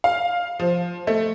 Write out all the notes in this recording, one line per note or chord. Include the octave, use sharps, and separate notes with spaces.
F5
F3
A3